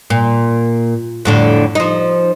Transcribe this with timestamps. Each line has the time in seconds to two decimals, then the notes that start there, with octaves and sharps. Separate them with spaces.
0.10 A#2
1.25 F2 A2 D3
1.75 F3 D#4